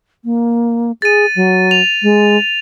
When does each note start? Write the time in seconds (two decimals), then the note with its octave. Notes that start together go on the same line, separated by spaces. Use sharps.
0.25 A#3
1.02 G#4 A6 D#7
1.36 F#3
1.71 F7
2.02 G#3